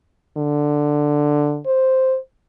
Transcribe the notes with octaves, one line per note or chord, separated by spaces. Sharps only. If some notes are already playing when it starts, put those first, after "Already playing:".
D3
C5